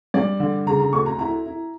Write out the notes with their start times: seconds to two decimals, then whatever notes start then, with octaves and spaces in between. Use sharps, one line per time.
0.14 G2 D5
0.40 D3
0.67 C#3 A#5
0.80 A#5
0.93 D2 C#6
1.06 A#5
1.19 E4 A#5
1.46 E4